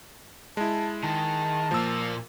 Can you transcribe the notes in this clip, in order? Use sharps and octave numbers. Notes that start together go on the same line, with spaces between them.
G#3 E4 A5
D#3 A5
A#2 F3 A#3 E6